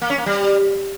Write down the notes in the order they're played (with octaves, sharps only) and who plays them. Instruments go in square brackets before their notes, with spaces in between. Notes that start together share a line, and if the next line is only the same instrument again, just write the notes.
[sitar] A#3
C#4
A#3
G3